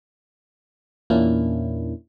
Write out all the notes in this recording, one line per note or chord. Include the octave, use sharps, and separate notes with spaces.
E2 A#2 A#3 C#4 D4 E4